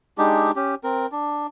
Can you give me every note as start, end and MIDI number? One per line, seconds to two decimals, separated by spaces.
0.18 0.51 56
0.18 0.51 62
0.18 0.51 63
0.18 0.51 67
0.56 0.75 61
0.56 0.75 67
0.84 1.06 60
0.84 1.06 70
1.12 1.47 62